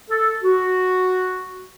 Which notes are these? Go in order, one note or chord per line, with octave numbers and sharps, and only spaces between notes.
A4
F#4